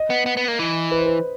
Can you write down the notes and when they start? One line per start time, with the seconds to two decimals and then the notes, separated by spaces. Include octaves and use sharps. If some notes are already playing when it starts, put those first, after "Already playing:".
Already playing: D#5
0.10 B3
0.26 B3
0.37 B3
0.48 A#3
0.59 E3
0.91 B4
0.99 C5
1.06 B4